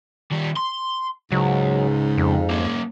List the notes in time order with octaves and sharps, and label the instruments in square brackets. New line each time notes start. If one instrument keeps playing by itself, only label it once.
[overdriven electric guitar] D#3 G3
C6
[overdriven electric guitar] C#2 [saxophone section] G#2 [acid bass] F#3
[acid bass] F2
[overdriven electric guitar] A#3 C#4